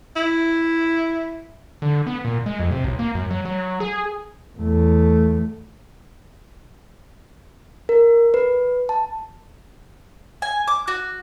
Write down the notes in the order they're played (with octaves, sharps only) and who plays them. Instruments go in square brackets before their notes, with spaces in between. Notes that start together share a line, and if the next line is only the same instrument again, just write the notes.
[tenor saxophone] E4
[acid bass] D3
B3
A#2
G#3
F2
C3
B1
A#3
F#2
F#3
F#3
G#4
[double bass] E2 A3
[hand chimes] A#4
B4
A5
[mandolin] G#5
D6
F#4